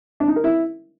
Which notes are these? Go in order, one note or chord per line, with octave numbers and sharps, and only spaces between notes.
D4
D#4
A#4
E4